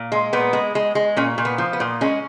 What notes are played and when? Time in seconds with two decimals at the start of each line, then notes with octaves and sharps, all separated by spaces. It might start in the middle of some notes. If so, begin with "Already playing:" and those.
Already playing: A#2
0.12 G#3
0.33 A#2 B3
0.53 G#3
0.75 G#3
0.95 G#3
1.16 A#2 C#4
1.38 A#2
1.45 B3
1.58 F3
1.73 B3
1.80 A#2
2.01 G#3 C#4